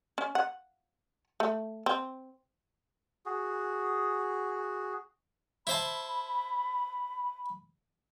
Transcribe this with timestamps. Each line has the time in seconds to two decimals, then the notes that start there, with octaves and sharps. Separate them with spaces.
0.18 C#4
0.35 F#5
1.40 A3
1.86 C4
3.26 F#4 G#4
5.67 E4 C5 A5 B5